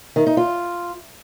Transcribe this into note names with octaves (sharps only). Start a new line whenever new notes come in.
D#3
D#4
F4